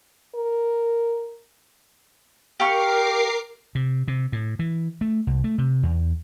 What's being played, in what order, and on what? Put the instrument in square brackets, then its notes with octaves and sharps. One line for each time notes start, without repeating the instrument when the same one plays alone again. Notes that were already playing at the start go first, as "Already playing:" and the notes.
[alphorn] A#4
[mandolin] G4 F5 C#6 [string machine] A#4 D6 C7
[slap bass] C3
C3
A2
E3
A3
C2
A3
C3
E2